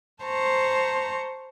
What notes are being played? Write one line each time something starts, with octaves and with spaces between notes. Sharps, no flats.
C5 A5 A#5 C#6